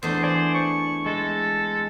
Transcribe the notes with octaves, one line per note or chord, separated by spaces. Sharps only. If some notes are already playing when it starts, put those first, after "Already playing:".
E2 A3 D4 C5
C5 D5 G#5
C#6
G#3 A4